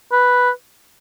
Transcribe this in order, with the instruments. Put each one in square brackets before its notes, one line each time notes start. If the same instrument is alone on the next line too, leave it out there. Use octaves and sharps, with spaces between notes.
[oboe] B4